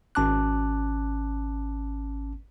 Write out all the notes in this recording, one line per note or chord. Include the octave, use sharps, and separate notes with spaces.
G#1 C#4 A5 D6 F#6